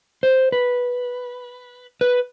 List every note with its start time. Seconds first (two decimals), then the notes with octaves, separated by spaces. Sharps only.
0.23 C5
0.52 B4
2.01 B4